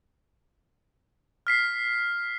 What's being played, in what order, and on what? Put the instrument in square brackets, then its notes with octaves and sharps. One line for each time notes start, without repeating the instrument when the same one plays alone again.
[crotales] F6 B6 C7